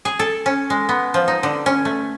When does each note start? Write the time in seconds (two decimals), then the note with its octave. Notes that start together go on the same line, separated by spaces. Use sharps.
0.05 G#4
0.19 A4
0.46 C#4
0.70 G#3
0.89 B3
1.14 F3
1.28 D#4
1.43 D3
1.66 C#4
1.85 A3